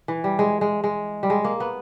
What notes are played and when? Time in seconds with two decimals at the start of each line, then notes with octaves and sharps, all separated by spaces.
0.08 E3
0.24 G3
0.39 G#3
0.61 G#3
0.84 G#3
1.23 G3
1.30 G#3
1.44 A#3
1.60 B3